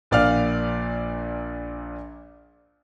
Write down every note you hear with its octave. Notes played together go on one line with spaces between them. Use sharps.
A#1 A#2 D5 F5 F6